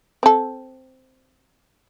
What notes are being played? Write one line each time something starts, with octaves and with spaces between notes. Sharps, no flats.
C4 A4